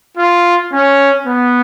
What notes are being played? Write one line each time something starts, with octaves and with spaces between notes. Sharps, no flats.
F4
C#4
B3